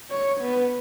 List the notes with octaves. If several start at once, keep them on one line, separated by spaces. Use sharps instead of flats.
C#5
B3